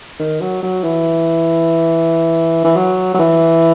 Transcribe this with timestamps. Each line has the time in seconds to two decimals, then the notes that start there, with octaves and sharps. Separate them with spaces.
0.19 D#3
0.41 F#3
0.63 F#3
0.83 E3
2.64 E3
2.76 F#3
3.14 F#3
3.19 E3